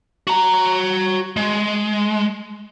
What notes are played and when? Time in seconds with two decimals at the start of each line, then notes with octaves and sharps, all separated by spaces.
0.27 F#4 A#5
1.37 G#3